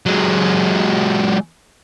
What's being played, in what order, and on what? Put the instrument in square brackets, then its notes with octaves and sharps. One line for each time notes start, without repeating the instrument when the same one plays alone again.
[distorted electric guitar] F#3 G#3